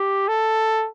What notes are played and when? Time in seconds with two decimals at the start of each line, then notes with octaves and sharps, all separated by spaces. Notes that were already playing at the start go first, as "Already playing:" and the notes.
Already playing: G4
0.28 A4